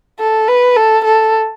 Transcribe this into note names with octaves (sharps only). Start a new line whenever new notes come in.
A4
B4
A4
A4